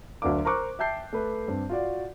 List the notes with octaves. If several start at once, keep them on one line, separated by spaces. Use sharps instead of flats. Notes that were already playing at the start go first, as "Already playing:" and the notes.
D2 F#3 D4 A#4 F5 D6
A#4 C5 A#5 C#6 D6 F#6
E5 G5 A5 G6 C7
A3 B4
G2 C4
F4 F#4 D5